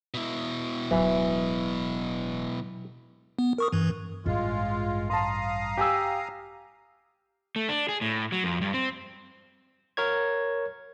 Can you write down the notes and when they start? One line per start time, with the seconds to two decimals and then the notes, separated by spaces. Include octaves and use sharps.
0.14 B2 E4
0.91 D1 E3 F#3
3.39 B3
3.58 A#4 C#6 D#6
3.72 G2 E3
4.26 A1 G2 G#3 F4
5.10 F5 A5 A#5 C6 D#6
5.77 G4 G#5 E6
7.56 A3
7.69 D4
7.89 G#4
8.01 A2
8.32 F#3
8.44 F2
8.61 G2
8.74 C4
9.97 A#4 C#5 G#6